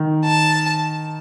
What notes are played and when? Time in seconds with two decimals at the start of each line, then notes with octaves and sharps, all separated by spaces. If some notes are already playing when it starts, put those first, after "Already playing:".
Already playing: D#3
0.25 A5